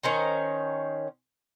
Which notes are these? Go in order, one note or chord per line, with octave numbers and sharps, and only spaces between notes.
D#3 C#4 C5 A#5